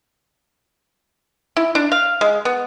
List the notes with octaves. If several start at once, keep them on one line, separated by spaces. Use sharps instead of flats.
E4
D4
F5
G#3
B3